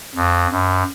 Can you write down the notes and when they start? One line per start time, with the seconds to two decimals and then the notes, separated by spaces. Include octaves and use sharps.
0.15 F2
0.51 F#2